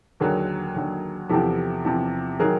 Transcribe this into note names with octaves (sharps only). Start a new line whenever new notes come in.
D#2 D3 F#3 G#4 A#4
D#2 D3 F#3
E2 C3 F3 G4 A4
E2 C3 F3
D#3 F#3 G#4 A#4